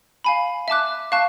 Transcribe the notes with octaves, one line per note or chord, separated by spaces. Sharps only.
F5 G#5 B5
E5 A5 D6 F#6
F5 A5 C#6 F#6